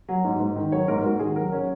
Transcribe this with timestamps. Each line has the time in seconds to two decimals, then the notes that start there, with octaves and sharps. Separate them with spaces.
0.09 F#3
0.24 G#2
0.40 G#2
0.56 D#3
0.72 F#3 C#5
0.88 G#2 A#4
1.04 G#2 F#4
1.19 D#3 G#4
1.36 F#3 A#4
1.52 C#4